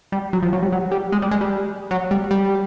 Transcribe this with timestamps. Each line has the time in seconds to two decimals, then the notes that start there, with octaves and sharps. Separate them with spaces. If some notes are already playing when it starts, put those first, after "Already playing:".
0.12 G3
0.33 F#3
0.43 F3
0.53 F#3
0.63 G3
0.72 F#3
0.91 G3
1.12 G#3
1.22 G3
1.31 G#3
1.41 G3
1.91 F#3
2.11 G3
2.31 G3